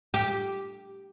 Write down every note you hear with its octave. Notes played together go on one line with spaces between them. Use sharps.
G4